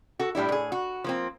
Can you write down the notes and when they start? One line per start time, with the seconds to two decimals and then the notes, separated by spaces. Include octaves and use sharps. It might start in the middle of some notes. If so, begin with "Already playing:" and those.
0.19 F#4 A4
0.35 A2 G3 D4 E4
0.49 A2 G#4
0.72 F#4
1.04 F3 A#3 C4